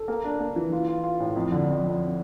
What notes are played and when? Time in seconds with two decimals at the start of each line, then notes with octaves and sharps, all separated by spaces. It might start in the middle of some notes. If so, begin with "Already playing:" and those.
Already playing: A4
0.08 A#3
0.24 D4
0.40 A#3
0.56 E3
0.72 F4
0.88 F4
1.04 F4
1.20 A2
1.36 F2
1.52 D3
1.68 F2
1.84 F2